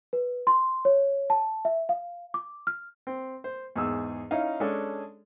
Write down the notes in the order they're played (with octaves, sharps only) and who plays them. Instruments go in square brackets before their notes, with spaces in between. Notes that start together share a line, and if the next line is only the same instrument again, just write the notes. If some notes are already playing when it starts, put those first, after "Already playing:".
[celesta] B4
C6
C#5
A5
E5
F5
D6
F6
[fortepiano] C4
C5
E2 G#2 G#4 E6
C#4 D#4 E4 D#5 F5
G#3 C#4 D4 G#4 A4